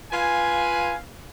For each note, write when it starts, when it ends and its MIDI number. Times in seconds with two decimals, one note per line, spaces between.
0.12 0.94 65
0.12 0.94 71
0.12 0.94 77
0.12 0.94 80